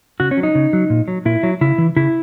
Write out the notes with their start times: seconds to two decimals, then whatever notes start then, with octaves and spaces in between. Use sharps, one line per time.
0.20 C#3 F#4
0.31 C#4
0.37 F#3
0.43 D#4
0.55 C#3
0.73 F#3
0.90 A#2
1.08 F#3
1.25 A#2 E4
1.43 F#3
1.61 C#3 E4
1.78 E3
1.96 C#3 E4